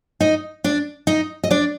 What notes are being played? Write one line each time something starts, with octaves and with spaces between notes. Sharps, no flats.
D#4 D#5
D4 D5
D#4 D#5
D#5
D4 D5